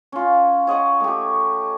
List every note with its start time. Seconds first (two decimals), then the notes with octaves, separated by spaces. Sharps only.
0.12 C#4 F4
0.67 C#5 D#5 F#5 C#6
1.00 A3 G4